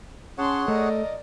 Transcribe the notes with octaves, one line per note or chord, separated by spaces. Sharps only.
C#4 G#4 C#5 F#5 A5 C6
A3 A#4 D5 D#5